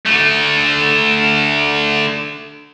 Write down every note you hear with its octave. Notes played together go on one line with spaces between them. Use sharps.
D3 A3